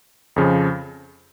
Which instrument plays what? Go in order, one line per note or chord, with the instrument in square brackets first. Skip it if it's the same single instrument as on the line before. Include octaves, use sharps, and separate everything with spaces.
[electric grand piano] F2 C#3 F3